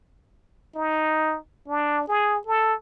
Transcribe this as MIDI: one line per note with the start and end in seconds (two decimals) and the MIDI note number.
0.75 1.38 63
1.68 2.06 62
2.08 2.39 68
2.47 2.74 69